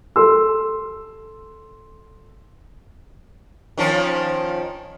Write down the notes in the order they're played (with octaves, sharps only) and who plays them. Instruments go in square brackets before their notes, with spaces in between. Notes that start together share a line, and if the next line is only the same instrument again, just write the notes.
[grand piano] A4 C6 E6
[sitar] D#3 F3 C#4